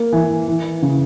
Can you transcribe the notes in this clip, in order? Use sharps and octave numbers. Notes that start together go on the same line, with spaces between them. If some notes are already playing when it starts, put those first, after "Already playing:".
Already playing: A#3
E3
E3
C#3